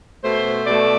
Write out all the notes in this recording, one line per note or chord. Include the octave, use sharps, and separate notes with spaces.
B2 A3 C5
B2 A3 D5